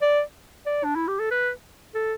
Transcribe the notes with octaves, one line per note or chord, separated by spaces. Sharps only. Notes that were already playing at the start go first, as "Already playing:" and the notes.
D5
D5
D4
E4
G4
A4
B4
A4